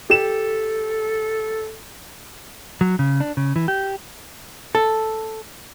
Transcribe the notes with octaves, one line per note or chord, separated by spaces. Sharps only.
G4 A4 E7
F#3
C#3
D4
C#3
E3
G4
A4